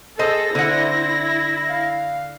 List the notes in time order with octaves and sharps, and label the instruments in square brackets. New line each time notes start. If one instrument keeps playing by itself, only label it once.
[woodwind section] G#4 [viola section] A4 [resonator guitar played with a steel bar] C5 D#5 A5 [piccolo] A#6
[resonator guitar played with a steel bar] D3 F#5 [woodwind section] C4 C#4 C5 [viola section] E4
[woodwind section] F5